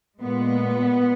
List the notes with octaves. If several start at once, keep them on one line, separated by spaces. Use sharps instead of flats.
A#2 G#3 B3